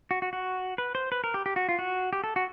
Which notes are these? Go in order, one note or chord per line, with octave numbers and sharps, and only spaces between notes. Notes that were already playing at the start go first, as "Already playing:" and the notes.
F#4
F#4
F#4
B4
C5
B4
A#4
G4
G4
F#4
F4
F#4
G4
A4
F#4